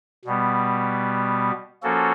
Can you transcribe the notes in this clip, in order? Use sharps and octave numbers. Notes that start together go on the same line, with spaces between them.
B2 G3 B3
F3 A#3 C#4 F#4 A4